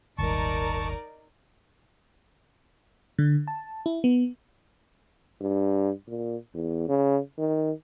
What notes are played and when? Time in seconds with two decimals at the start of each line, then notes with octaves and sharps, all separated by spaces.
0.18 D#1 G#1 D#4 A#4 D5 A5 C#6
3.19 D3
3.48 A5
3.86 E4
4.04 B3
5.41 G2
6.07 A#2
6.54 E2
6.88 C#3
7.38 D#3